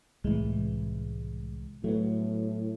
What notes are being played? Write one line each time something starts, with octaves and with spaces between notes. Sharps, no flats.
C2 A2 E3 G#3
A2 F#3 A3 B3